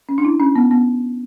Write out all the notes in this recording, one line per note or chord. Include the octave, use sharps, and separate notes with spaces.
C#4
D4
E4
C#4
B3
B3